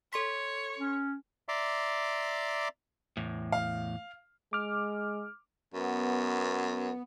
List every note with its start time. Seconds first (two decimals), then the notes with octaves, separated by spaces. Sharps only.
0.13 A4 C#5 C6 B6
0.78 C#4
1.48 D5 E5 A#5 C6 D6
3.17 E2 A2
3.52 F5
4.53 G#3 D6 F6
5.74 F#2 B3